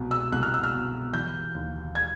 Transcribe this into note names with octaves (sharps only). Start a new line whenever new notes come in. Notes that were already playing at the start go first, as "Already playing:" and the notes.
Already playing: C2 B2
E6
C2 F#6
F6
E6
F6
B2
E3 G6
D#2
G#6